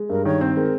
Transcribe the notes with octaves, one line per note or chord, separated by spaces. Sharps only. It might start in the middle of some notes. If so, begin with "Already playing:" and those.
Already playing: G#3
G2 A#4
D#3 C#5
C4 C5
G#3 A#4